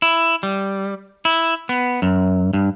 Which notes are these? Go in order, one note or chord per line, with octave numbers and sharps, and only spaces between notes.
E4
G3
E4
B3
F#2
G2